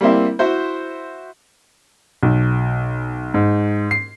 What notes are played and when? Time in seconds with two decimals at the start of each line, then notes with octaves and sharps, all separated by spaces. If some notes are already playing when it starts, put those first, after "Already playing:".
0.01 G3 A#3 C4 E4
0.39 E4 F#4 C5
2.23 B1
3.34 G#2
3.91 C7